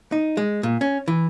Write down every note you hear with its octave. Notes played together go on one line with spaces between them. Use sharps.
D#4
G#3
A#2
C#4
E3